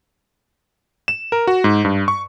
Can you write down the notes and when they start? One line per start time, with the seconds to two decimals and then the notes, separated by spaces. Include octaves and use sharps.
1.08 E7
1.32 A#4
1.47 F#4
1.64 G#2
1.85 G2
2.08 C#6